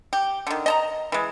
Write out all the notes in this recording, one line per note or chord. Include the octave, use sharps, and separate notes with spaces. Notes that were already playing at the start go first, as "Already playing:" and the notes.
G4
D3 D#3
D#5 A5 A#5
E3 G#3